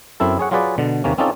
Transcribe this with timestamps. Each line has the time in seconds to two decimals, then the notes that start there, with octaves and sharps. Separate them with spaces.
0.20 F#2 C4 E4 A4
0.39 G#4 C#5 F#5
0.51 F#3 F4 G#4 B4 D5
0.78 B2 D3
1.04 D#2 C3 A#3 C#4
1.18 C4 C#4 D#4 F4 A4 D5